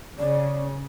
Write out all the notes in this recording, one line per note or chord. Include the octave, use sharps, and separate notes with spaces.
C#3 D5